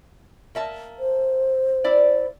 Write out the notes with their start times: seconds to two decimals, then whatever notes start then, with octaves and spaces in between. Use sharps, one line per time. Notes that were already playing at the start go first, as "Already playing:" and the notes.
0.55 A#3 E5 A5
0.99 C5
1.84 E4 D5